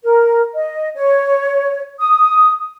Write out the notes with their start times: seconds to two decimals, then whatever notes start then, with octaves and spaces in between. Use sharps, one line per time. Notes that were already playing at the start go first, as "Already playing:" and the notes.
0.03 A#4
0.54 D#5
0.95 C#5
2.00 D#6